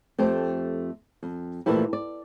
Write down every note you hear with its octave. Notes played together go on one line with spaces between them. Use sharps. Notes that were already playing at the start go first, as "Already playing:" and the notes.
F2 A3 G4 C5
F2
A#2 E3 F3 A3 E4 G4
D5